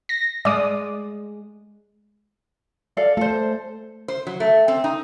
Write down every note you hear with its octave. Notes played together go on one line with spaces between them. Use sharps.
A#6
G#3 D5 D#6
A4 D5 F5
A3 A4 C5
C5
F#3
A3
C4
D#4